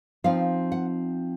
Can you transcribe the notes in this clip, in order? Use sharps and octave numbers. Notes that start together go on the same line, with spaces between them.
F3 C4 D#4 F5
F#5